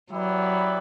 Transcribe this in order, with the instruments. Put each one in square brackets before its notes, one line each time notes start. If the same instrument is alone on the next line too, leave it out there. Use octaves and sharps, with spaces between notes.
[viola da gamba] F#3 [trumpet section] B3 E4 G4 B4 D5